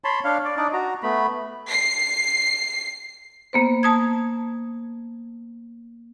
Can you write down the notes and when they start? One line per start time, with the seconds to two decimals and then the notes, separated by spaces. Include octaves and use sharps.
0.04 C#5 A5 B5 C6
0.24 D4 C#5 F5
0.45 D5
0.57 D4 D#4 D5
0.73 F#4 A#5
1.03 A3 B3 B5
1.70 C7
3.53 A#3 B3 C5
3.83 A5 D#6 G#6